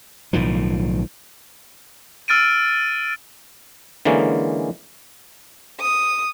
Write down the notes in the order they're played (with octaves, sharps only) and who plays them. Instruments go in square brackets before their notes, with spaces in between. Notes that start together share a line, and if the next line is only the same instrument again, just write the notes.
[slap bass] B1 A2 D#3 F3
[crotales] E6 F6 A6 D7 D#7
[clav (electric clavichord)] D3 E3 G#3 A#3 C#4
[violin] D#6